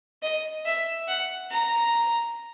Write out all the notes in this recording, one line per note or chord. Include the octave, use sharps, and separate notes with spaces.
D#5
E5
F#5
A#5